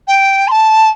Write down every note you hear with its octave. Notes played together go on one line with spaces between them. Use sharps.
G5
C6
A5